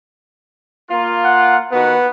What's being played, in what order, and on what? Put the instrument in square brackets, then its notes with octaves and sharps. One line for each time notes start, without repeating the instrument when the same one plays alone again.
[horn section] A#3 F4
[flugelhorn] F#5
[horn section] D#3 F#4 B4 [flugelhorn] B3